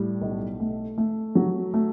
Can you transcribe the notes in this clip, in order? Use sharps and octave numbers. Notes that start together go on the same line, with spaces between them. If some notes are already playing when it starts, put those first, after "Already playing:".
Already playing: A2 G3
B1
A3
A3
F#3
A3